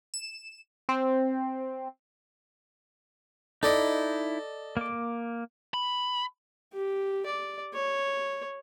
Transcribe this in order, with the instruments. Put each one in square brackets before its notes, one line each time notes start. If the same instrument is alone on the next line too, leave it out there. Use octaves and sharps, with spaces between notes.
[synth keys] E7
C4
[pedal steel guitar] D#4 E4 [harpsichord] A4 D5 D#5
[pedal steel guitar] A#3 D6
[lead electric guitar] B5
[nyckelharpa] G4
D5
C#5